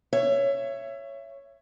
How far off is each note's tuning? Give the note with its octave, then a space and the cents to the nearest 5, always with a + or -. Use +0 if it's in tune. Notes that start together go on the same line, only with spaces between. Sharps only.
C#5 +0 E5 +25